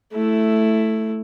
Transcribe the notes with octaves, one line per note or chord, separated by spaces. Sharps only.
A3 E4